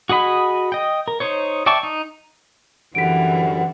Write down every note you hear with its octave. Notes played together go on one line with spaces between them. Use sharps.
F#4 G#4 D#5 B5
D#5 G5
A#4
D#4 C5 C#5
D5 E5 G5 A5 C#6
D#4
F#2 D3 E3 G3 F#5 B6 D7